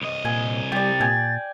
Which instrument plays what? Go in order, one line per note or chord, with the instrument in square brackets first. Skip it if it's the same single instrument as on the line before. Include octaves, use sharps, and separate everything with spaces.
[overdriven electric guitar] C2 D#5
[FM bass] A#2 [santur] G#5
[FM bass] G3 [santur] G4 D5 [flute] A6
[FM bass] A#2 [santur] G5 G#5